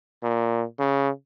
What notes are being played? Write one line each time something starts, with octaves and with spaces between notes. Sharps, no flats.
A#2
C#3